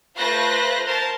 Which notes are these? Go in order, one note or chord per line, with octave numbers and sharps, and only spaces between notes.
A3 F4 B4 C5 F#6 A#6
A#4 C5 A5